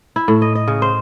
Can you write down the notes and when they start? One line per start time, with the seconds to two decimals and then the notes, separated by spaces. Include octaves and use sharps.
0.16 E4
0.28 A2
0.42 D#5
0.55 D#5
0.68 C#3
0.82 C5